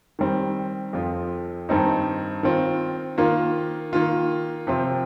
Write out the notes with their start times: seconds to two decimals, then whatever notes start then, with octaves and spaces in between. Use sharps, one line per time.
0.19 D#3 G3 C4
0.93 F2 F3 C4 F4
1.69 G2 D#3 C4 D#4
2.43 D#3 C4 F4
3.18 D#3 A#3 F4
3.93 D#3 A#3 F4
4.67 C3 F3 C4 F4